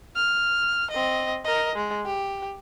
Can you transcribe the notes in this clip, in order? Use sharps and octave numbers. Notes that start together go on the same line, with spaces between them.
F6
C4 D#5
A#4 D#5
G#3
G4